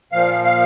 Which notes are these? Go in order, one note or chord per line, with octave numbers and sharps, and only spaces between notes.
A#2 F3 F5
F5